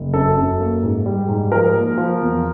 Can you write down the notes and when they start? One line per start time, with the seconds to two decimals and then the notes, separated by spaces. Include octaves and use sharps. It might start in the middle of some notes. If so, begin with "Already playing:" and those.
Already playing: F#1
0.13 F#2 A4
0.37 F#2
0.60 A#3
0.83 G#2
1.06 G3
1.29 G#2
1.52 F3 A#4
1.74 A#3
1.97 F3
2.21 E2